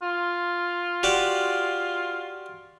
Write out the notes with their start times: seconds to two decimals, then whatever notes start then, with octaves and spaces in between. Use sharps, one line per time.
0.02 F4
1.03 F#4 G4 D5